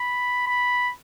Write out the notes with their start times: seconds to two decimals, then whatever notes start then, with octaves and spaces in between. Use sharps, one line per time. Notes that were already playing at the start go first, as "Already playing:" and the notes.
Already playing: B5
0.47 B5